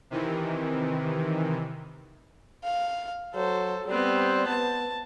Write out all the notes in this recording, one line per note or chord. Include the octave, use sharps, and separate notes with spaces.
C3 D#3 E3
F5
F#3 A4 C5
G3 B3 C4 C5
B3 A5